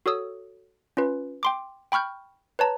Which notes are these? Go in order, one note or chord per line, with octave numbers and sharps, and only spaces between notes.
F#4 A4 C#5 D#6 E6
C#4 F4 B4
G5 C6 D6
G5 B5 C#6 F6 G6
B4 C#5 A5 A#5